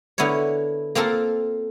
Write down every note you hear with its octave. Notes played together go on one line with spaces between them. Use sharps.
D3 B3 E4 A#4 C#5
A#3 C4 F4 A4 A#4